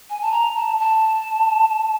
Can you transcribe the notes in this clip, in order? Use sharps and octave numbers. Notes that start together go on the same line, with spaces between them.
G#5
A5
A#5
A5
A5